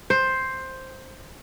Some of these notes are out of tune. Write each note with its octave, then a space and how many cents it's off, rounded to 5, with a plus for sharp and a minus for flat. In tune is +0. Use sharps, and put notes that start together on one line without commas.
C5 +5